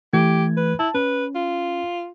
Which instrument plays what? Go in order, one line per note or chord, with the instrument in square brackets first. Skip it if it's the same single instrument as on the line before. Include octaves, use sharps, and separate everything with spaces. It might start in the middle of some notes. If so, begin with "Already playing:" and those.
[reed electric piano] E3 A3 G#6 [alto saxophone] G4
[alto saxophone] B4
[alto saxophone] E4 [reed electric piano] A5
[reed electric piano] C#4 [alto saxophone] B4
[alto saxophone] F4